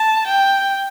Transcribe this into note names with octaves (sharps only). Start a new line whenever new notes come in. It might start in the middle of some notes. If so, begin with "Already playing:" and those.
Already playing: A5
G5